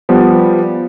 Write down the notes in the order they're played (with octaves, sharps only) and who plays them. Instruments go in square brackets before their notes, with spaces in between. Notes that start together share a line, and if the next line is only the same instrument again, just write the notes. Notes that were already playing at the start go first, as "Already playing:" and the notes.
[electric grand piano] F3 G3 B3